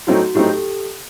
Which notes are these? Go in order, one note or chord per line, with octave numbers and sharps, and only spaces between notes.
A2 F#3 A3 C4 D#4 F#4
A2 F#3 A3 C4 D#4 G4
G4 A4